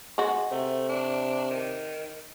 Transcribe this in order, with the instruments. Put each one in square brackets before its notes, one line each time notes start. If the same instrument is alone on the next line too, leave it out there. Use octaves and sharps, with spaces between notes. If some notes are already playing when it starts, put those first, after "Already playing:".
[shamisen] G#3 F#4
[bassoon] C3 [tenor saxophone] A3
[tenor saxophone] D4
D#3